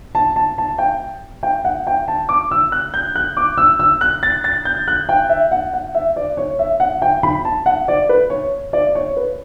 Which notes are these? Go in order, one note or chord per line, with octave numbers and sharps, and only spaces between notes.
A5
A5
A5
G5
G5
F#5
G5
A5
D6
E6
F#6
G6
F#6
D6
E6
E6
F#6
A6
A6
G6
F#6
G5
E5
F#5
F#5
E5
D5
C#5
E5
F#5
G5
B5
A5
F#5
D5
B4
C#5
D5
C#5
B4